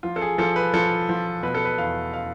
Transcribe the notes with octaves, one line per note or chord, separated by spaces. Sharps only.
F3 F4
A4
G#4
F3 A4
B4
F3 A4
F3
B2 B4
A4
B4
E2 F5
F5